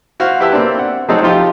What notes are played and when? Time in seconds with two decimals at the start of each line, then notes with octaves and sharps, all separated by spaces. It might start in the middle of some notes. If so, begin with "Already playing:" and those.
0.20 E4 F#4 C5 F5
0.40 E4 G4 B4 E5 A5 E6
0.53 A#3 C4 D4
0.79 F#5
1.08 F#3 A3 C4 D#4 G#4 A4
1.22 F3 D#4 F4 G4